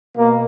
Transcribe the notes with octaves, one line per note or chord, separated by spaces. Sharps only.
B2 A#3